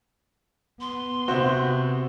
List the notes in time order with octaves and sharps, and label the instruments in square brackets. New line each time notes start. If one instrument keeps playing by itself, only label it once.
[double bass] B3 [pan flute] C6
[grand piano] C3 C4 [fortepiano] F#4